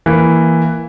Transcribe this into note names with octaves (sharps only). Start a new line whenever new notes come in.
E3 A#3